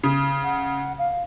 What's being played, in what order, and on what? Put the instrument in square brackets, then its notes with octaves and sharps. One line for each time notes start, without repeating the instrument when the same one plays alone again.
[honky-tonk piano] C#3
[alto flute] F#5
F5